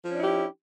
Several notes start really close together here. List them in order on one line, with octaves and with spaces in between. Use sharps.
F3 C#4 D4 E4 G4